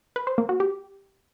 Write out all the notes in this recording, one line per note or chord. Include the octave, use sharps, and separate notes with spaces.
B4
C5
A#3
F#4
G4